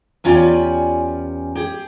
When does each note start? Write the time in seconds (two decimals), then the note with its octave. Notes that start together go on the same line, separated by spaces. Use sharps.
0.24 E2 C#4 F4 G4 D5 G#5
1.55 G4 G#4